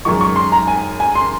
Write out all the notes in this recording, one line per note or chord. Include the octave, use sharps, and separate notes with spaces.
F#2 D#3 G#3 C#6
C#6
C6
A#5
G#5
G#5
C6